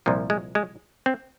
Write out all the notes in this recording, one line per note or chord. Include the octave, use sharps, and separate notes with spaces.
C2 A#2 F3
G#3
G#3
C4